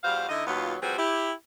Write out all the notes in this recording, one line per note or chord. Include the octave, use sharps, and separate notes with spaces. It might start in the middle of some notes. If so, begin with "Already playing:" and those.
E2 G3 F#4 C5 F5
D3 D#4 E4 D#5
D#2 B2 F#3 B3 F4
F3 G3 C4 F#4 G#4 B4
E4 G4